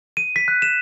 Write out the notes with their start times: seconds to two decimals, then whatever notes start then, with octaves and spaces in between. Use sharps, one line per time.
0.17 D#7
0.36 B6
0.48 F#6
0.62 E7